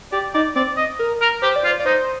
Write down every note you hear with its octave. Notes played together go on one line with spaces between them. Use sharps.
G4 D5
D#4 D5
C4 D5
D#5
A#4
A#4
G4 C5
D5
F4
C5
D5
D#4 C5